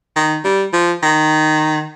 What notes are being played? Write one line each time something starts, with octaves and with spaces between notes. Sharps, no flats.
D#3
G3
F3
D#3